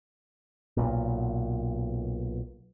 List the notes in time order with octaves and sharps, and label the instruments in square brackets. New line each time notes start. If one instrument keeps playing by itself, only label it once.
[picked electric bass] B1 A#2